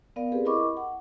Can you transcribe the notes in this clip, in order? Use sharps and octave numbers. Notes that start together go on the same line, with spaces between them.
B3 A#4 D5 F5
C4 G4 G#4 A#4 B4
E4 A#4 D#5 B5 C#6 D6
F#5